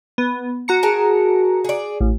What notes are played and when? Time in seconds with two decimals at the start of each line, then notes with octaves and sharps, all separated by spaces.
0.18 B3
0.68 F#4 A#5 C#7
0.83 G#4 A#4 A5
1.64 G#4 D5
2.01 A1